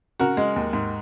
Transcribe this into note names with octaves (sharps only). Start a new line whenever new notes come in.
C#3 F#4 A#4
G#3
D#2
G#2